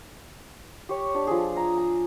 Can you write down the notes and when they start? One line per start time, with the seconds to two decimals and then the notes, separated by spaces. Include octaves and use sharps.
0.89 G4 C#5
1.14 D4 G4
1.27 F3 G#4
1.56 A#5
1.77 A#5